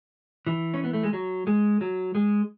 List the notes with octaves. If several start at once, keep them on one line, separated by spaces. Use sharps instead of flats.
E3
C#4
B3
A3
G#3
F#3
G#3
F#3
G#3